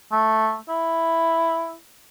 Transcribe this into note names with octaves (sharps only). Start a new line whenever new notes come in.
A3
E4